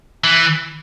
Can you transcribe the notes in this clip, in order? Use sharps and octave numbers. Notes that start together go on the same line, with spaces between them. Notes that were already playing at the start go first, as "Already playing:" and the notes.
E3